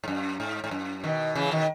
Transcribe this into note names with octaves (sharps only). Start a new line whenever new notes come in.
G#2
F#2
G#2
G#2
F#2
B2 D#3
C#3 E3
B2 D#3